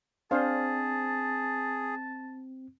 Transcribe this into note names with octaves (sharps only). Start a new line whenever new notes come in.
C4 D4 G#4 C5 F5 A5